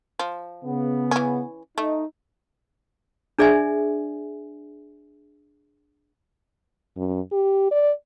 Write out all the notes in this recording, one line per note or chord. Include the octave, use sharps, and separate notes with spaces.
F3
C#3 B3
E3 C#4
A3 D#4
D4 G#4 D5 E5 G#5
F#2
G4
D5